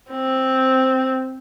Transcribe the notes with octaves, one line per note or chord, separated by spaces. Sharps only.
C4